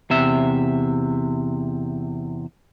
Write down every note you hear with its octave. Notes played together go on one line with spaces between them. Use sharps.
E2 C3 E5